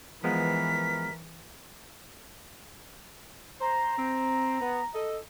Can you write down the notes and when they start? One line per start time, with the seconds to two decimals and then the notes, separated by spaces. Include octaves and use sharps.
0.24 E3 F3 G#3 B3 A#4 B6
3.61 C5 A#5
3.98 C4
4.61 B3
4.94 A4 D#5